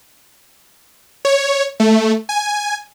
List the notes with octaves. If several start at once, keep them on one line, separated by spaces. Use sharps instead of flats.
C#5
A3
G#5